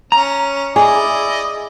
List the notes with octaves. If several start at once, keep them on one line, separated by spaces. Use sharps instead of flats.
C#4 A#5
E4 G#4 D5 D#5